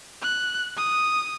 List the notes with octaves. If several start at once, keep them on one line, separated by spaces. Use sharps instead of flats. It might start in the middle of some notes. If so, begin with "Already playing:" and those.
F#6
D#6